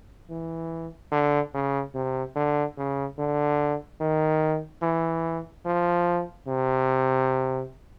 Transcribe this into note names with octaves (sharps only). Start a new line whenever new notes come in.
E3
D3
C#3
C3
D3
C#3
D3
D#3
E3
F3
C3